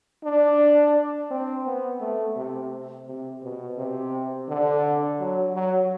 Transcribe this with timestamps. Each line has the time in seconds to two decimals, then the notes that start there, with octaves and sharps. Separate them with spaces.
0.24 D4
1.30 C4
1.66 B3
2.01 A3
2.36 C3
3.08 C3
3.43 B2
3.77 C3
4.48 D3
5.19 F#3
5.54 F#3